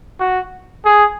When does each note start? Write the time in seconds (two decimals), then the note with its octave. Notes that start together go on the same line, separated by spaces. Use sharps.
0.20 F#4
0.85 G#4